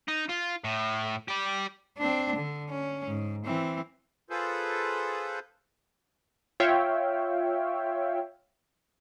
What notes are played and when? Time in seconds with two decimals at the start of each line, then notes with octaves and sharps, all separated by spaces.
0.08 D#4
0.29 F4
0.64 A2
1.28 G4 D5
1.98 C4 D4
2.36 D3
2.70 C#4
3.07 G#2
3.46 E3 C4
4.30 F4 G#4 A4 B4 C5
6.60 F4 C#5 E5 F5 G5